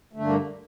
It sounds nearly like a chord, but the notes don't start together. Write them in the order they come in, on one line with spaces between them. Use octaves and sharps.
A3 D3 G2 A#3